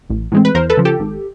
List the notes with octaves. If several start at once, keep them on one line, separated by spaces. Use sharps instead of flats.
A1
A2 E3 G#3 C4
B4
E2 A#4 C5
A4 B4
C#3 F3
G4 A4
G#1